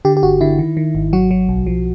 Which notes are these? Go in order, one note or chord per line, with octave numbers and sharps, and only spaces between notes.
D3 G4
G4
G1 F#4
D3 E4
D#3
D#3
G#1
F#3 F#4
F#3
B1
F3